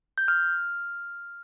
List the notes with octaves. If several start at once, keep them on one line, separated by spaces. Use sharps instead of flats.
G6
F6